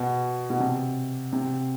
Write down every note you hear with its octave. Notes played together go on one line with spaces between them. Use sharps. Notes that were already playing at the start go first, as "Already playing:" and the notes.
Already playing: B2
B2
C3
C3